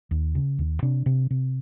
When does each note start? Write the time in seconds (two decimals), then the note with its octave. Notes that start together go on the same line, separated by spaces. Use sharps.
0.11 D#2
0.35 C#3
0.59 D#2
0.82 C3 D4
1.06 C3
1.30 C3